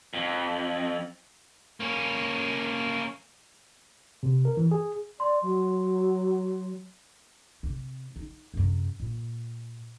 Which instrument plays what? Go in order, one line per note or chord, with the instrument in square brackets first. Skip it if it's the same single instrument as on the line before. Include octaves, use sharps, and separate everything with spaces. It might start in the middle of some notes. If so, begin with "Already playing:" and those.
[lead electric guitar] F2
[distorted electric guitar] A#3 C#4
[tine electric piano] C3
A#4
E3
G#4
[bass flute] D5 [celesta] C6
[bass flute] F#3
[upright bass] C3
D#4
F#2 C3
A#2